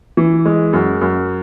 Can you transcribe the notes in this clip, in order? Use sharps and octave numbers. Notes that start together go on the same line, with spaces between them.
E3
G#3
F#2
F#2